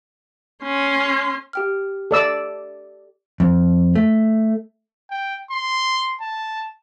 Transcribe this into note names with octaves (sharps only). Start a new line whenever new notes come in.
C#4 C6
G4 G5 F6
A4 D5 E6
F2
A3
G5
C6
A5